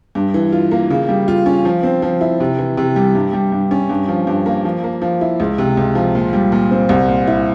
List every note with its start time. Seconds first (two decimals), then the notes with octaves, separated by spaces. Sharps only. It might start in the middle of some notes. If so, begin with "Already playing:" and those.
0.15 G2
0.34 E3
0.52 F4
0.71 A#3
0.90 C#3
1.09 G3
1.28 F4
1.46 C#4
1.65 F3
1.83 C4
2.02 F3
2.21 E4
2.40 C3
2.59 E3
2.77 C3
2.96 G3
3.15 G2
3.33 G3
3.52 G2
3.71 C#4
3.90 G2
4.08 F3
4.27 G2
4.46 A#3
4.65 F3
4.84 A#3
5.02 F3
5.21 E4
5.40 C#2
5.58 C3
5.77 C#2
5.95 F3
6.15 A#2
6.33 G3
6.52 A#2
6.71 C4
6.89 C2
7.08 A#2
7.27 E4